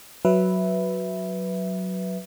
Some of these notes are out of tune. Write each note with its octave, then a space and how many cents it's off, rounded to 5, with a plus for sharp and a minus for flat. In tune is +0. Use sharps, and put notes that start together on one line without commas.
F#3 +0 B4 +0 E5 +0